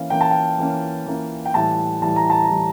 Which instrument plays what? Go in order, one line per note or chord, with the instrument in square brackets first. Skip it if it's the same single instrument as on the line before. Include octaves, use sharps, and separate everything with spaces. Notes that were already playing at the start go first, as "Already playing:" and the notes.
Already playing: [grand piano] E3 A#3 C#4 F5
E3 A#3 C#4 G5
A5
G5
E3 A#3 C#4
E3 A#3 C#4
G5
A2 E3 G3 A5
A2 E3 G3 A5
A#5
A5
A#5
A2 E3 G3